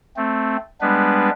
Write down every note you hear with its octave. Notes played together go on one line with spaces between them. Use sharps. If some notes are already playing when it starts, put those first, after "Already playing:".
A3 C4
G3 G#3 B3 D4 B4